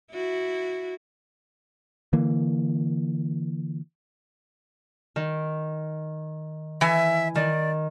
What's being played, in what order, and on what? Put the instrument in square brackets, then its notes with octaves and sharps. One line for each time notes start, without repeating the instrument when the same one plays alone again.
[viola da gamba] E4 F#4
[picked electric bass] D3 E3 A#3
[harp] D#3
[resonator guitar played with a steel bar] E3 G#5 [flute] E5
[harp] D#3 [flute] D5